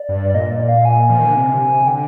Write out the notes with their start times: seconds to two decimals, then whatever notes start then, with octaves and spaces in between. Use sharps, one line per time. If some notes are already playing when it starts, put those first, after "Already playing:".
Already playing: D5
0.09 G2
0.29 D5
0.34 A#2 D#5
0.51 D5
0.68 F5
0.85 G#5
1.10 F3
1.19 D#3
1.27 D3
1.36 C3
1.83 C3
1.87 D3 G5